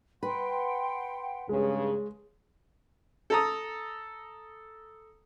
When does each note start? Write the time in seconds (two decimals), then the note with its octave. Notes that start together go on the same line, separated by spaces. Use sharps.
0.23 B4 F#5 G5 C6
1.49 G2 C#3 G#3
3.30 A4 A#5 D#6